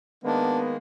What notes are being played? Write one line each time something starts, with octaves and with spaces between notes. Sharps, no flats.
D#3 G#3 A#3 B3 D4